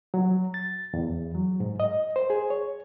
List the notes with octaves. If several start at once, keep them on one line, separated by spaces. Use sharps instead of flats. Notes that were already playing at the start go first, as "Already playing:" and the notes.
F#3
A6
E2
F#3
G#2
D#5
C5
G#4
C#5